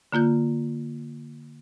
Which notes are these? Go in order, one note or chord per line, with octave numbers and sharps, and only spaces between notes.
D3 A#3 F4 G6